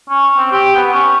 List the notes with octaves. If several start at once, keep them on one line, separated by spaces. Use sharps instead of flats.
C#4
C4
G4
B3
C#4